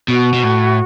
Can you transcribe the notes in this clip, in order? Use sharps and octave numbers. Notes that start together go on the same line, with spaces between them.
B2 F#4
B2
A2